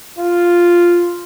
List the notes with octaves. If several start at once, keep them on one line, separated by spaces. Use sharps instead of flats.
F4